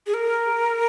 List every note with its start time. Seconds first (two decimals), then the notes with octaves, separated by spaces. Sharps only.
0.06 G#4
0.14 A#4